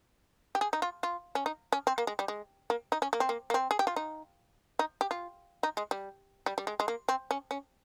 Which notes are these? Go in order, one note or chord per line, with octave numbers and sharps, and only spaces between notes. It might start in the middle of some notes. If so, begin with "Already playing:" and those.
G4
G#4
D#4
F4
F4
C#4
D#4
C#4
C4
A#3
G#3
G3
G#3
A#3
D#4
C#4
A#3
C4
A#3
A#3
C4
G#4
G4
F4
D#4
D#4
G4
F4
D#4
G#3
G3
G3
G3
G#3
G#3
A#3
C4
C#4
C#4